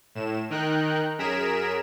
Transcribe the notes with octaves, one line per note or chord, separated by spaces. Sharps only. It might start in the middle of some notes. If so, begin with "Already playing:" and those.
A2 E7
D#3 D#4 A#4 G5 F#6
F#2 G#4 A#4 B6 D7 E7